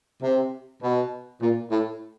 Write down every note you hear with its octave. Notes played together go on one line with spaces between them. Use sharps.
C3
B2
A#2
A2